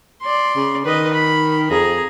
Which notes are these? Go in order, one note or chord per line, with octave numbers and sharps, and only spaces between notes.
D5 C6
C#3
D#3 B4 D#5
B5
F2 G#4 A#5